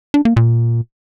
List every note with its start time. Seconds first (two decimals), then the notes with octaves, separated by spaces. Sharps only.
0.14 D4
0.25 A#3
0.37 A#2